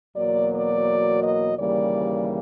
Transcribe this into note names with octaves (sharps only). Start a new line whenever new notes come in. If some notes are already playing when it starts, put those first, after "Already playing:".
E2 B2 F#3 A#3 D5
D5
D#5
D#2 C#3 E3 G3 A#3 D5